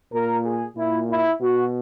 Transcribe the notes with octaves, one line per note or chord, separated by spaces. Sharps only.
A#2 A#4
G#4
A#2 E4
E4
B2 F#4